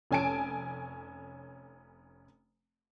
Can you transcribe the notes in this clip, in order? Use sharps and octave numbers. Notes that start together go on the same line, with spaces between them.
F1 C#4 G#5 A5 D7